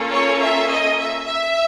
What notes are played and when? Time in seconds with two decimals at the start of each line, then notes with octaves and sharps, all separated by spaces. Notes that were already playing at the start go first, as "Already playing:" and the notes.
Already playing: A#3 C#4 F4 A4
0.13 C#5
0.41 E5
0.69 D#5
0.98 E5
1.26 E5